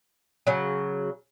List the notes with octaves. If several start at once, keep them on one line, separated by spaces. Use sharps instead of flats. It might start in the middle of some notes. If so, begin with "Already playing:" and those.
C#3 F#3